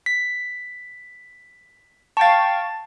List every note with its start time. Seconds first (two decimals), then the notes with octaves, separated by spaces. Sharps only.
0.06 B6
2.17 F5 G5 A5 C#6 A6